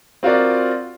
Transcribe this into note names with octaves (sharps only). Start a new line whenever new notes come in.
C4 F4 F#4 A#4 D5